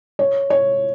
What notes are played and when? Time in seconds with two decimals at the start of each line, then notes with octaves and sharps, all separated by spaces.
0.19 C#5
0.50 C#5